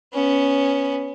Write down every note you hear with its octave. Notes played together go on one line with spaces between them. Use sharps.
B3 C#4